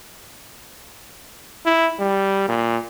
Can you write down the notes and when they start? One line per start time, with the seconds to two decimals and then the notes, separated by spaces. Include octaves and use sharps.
1.65 E4
2.00 G3
2.49 A#2